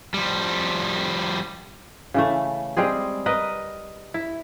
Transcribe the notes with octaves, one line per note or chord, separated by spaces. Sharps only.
F3 G3
C#3 E3 A3
G3 G#3 C4 G#4
A#4 B4 D#5
E4